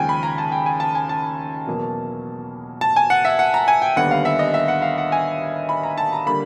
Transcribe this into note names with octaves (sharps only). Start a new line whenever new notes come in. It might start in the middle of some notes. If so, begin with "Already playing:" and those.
Already playing: D#2 C#3 F3 G#3 G5 G#5
B5
A#5
A5
G5
G#5
A5
G#5
A5
E2 B2 F#3 A#3
A5
G#5
F#5
E5
F#5
A#5
G#5
G5
D#2 D3 G3 B3 F#5
F5
E5
D#5
E5
F#5
F5
F#5
G#5
B5
A#5
A5
A#5
D3 G3 A#3 B5